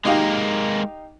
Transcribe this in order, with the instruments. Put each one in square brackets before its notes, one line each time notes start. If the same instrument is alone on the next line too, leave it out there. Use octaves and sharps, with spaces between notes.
[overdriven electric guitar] G#3 A#3 [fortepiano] D#4 G4 F5